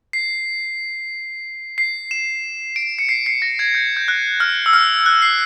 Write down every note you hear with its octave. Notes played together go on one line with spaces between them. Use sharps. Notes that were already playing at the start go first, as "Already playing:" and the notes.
C7
C7
E7
D7
C#7
C7
C7
A#6
G#6
G6
G6
F#6
F6
E6
F6
F#6
C7